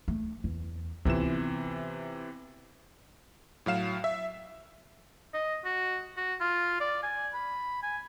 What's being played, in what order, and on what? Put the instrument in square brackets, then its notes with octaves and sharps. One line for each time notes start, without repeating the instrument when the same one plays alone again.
[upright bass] A3
E2
[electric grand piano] C3 E3 E7 [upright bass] B3 F4
[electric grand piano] A2 F#3 F5 E7
E5
[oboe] D#5
F#4
F#4
F4
D5
G#5
B5
G#5